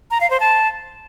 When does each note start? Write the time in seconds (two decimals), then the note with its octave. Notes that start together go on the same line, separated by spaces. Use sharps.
0.11 A#5
0.21 F5
0.30 C5
0.40 A5